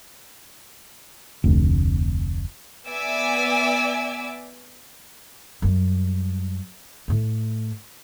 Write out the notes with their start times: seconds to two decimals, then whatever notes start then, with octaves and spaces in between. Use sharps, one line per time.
1.44 F1 D2
2.87 B3 D5 E5 G#5 D6 E6
5.62 F#2 G3
7.08 A2 A3